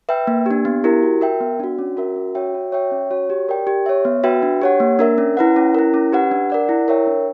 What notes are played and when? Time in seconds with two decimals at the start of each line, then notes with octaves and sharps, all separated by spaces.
0.09 B4 E5 G5
0.27 A#3
0.46 D4 G4
0.65 B3
0.84 E4 G4 A#4
1.03 F#4
1.21 A#4 E5 G5
1.41 B3
1.60 D4 F#4
1.79 C#4
1.97 F#4 A#4 E5
2.16 C#4
2.35 F#4 C#5 E5 G5
2.54 F#4
2.72 C#5 E5 G5
2.91 C#4
3.11 F#4 C#5
3.30 G4
3.49 A#4 D5 G5
3.67 G4
3.86 C#5 E5
4.05 B3
4.24 F#4 B4 E5 G5
4.43 D4
4.62 G4 C#5 F#5
4.80 A#3
4.99 D4 A#4 E5
5.18 C#4
5.37 E4 B4 F#5
5.56 C#4
5.75 E4 A#4
5.94 C#4
6.13 G4 B4 F#5
6.31 D4
6.50 A#4 D5 F#5
6.69 E4
6.88 A#4 C#5 E5 G5
7.07 D4